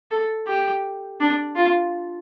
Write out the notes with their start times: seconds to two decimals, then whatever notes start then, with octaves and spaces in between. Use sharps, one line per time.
0.11 A4
0.47 G4
1.20 D4
1.56 F4